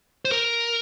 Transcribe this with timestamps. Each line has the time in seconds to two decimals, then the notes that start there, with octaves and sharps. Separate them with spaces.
0.25 C5
0.31 A#4